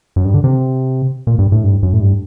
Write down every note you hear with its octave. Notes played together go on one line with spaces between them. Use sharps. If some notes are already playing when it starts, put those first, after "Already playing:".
F#2
G2
D3
C3
A#2
G2
A2
G2
F#2
A2
G2